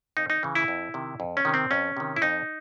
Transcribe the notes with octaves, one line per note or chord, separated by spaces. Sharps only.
F2 D#4
D#4
C#3 E3
E4
F2
C3 D#3
F2
C#4
C3 D#3
C4
F2 C#4
C3 D#3
E4
F2 D#4